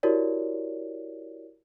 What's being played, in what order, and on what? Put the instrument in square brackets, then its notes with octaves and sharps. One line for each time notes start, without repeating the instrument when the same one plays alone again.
[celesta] E4 F#4 G4 A#4 C#5 D5